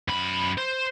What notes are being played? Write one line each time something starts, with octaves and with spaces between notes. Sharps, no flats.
F#2 B5
C5